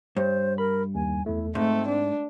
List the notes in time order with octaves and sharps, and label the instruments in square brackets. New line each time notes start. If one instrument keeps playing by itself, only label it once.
[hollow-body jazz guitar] G2 [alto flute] C5 [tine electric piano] C#5
[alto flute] A#4 [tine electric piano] B5
[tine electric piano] D#2 [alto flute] G#5
[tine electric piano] E2 A3 [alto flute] E4
[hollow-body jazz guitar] G#2 [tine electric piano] G#3 [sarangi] A3 [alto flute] C4
[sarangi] D4